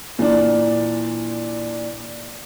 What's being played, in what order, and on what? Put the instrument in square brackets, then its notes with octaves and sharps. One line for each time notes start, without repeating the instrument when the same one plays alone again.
[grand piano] A#2 E3 D4